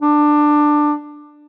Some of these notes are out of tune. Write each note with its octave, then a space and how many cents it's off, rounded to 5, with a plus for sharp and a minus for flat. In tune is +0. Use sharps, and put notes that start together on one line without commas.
D4 +15